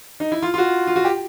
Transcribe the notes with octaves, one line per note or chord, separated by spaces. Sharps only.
D#4
E4
F4
F4
F#4
F4
F#4
G4